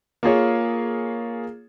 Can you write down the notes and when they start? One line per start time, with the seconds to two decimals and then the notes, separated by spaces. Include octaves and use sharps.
0.23 A#3 F4 G#4 C#5